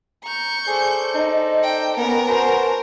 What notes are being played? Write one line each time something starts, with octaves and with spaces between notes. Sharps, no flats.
A#5 C#6 G6
G#4 A4 C5 D5
D#4 D#5
G5
B3 C#4 A#4
F#4 B4 C5 G#5 A5